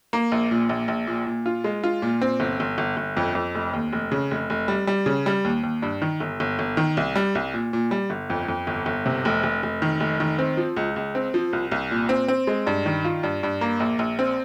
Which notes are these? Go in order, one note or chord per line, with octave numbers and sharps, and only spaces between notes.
A#3
A#1
A#2
A#1
A#1
A#2
A#2
F4
G#3
F4
A#2
C4
G1
G1
G1
G1
F2
F2
F1
D#2
F1
C#3
F1
F1
G3
G3
C#3
G3
D#2
D#2
G2
D#3
G1
G1
G1
D#3
C2
G3
C2
A#2
A#2
G3
G1
F2
F2
G1
G1
C3
F1
F1
F1
D#3
F1
D#3
C4
F3
C#2
C#2
C4
F3
C2
C2
A#2
C4
C4
G#3
G2
D#3
F4
G2
G2
A#3
A#1
A#1
C4